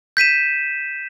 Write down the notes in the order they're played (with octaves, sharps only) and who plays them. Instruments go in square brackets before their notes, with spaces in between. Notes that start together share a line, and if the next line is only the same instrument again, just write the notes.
[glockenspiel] G6 B6 D#7 E7